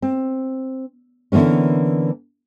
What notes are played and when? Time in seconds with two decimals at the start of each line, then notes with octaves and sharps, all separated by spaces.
0.02 C4
1.32 D3 E3 A#3 B3 C#4